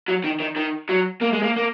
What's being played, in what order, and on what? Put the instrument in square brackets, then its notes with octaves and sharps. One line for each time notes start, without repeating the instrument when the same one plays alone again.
[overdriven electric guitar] F#3
D#3
D#3
D#3
F#3
A#3
G#3
A#3
A#3